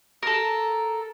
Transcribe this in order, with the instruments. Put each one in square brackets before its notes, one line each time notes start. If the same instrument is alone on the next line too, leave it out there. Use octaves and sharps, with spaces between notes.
[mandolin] A4 A#4